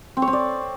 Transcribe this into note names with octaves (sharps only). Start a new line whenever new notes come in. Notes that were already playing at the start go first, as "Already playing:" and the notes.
C4
C#5
C4
D5